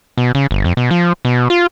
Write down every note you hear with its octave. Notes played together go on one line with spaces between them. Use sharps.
B2
C#3
G1
F2
B2
F3
B2
F4